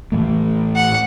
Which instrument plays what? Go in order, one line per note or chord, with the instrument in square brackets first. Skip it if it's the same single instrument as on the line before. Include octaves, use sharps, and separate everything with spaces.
[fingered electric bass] A2 E3 A3
[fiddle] F#5